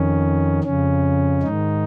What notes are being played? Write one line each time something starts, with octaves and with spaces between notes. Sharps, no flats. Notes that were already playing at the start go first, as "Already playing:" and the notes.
Already playing: F2 D#3 C#4
F2 C#3 C#4
G#2 D#3 D#4